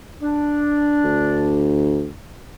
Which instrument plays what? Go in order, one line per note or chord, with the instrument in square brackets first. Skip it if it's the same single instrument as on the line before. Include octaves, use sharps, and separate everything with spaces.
[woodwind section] D4
[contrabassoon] D2